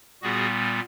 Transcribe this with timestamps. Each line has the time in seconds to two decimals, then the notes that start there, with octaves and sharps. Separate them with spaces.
0.22 A#2 G3 B3 F#4 G#4